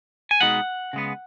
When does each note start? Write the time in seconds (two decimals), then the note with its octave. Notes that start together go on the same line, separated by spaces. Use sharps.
0.31 G#5
0.41 B2 G#3 B3 D#4 F#5
0.93 C#3 G#3 B3